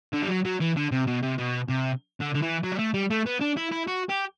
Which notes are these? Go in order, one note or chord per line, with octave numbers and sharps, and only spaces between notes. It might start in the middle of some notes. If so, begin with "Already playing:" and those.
D3
G3
F#3
F#3
E3
D3
C3
B2
C3
B2
C3
D3
D3
E3
F#3
G3
A3
G3
A3
B3
D4
E4
E4
F#4
G4